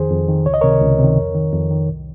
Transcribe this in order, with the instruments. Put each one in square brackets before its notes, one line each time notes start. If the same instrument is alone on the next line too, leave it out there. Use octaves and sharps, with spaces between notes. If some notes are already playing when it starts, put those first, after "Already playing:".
Already playing: [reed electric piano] F2 D#3 G#4 C5
F2
D#3
C#2 C#5
D#5
C3 D#3 A#4 C#5
C#2
C3 D#3
F2
D#3
F2
D#3
C2